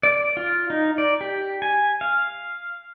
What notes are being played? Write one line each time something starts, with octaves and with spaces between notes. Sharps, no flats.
D5
F4
D#4
D5
G4
G#5
F5